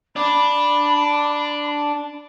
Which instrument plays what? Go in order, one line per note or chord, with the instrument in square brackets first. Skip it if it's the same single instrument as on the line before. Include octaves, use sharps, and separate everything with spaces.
[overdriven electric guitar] D4 [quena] B5